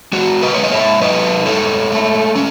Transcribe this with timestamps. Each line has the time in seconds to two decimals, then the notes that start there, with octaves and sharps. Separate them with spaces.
0.12 G#3 F#4
0.42 B4 D#5
0.54 G#3 C#5
0.64 D#5
0.71 C#5 E5
1.01 D#4 B4 D#5
1.46 G#3 A4 C#5
1.92 A3
2.35 C#4